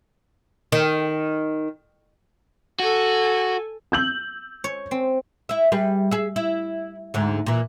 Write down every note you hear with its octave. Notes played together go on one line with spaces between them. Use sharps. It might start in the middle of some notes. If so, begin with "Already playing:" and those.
D#3
F#4 A4 G#5
E6 G6 F#7
C#5
C4
E4 E5
G3 G#4 B4
G#4 E5
E4
D2 G#2 D3
A#2 E3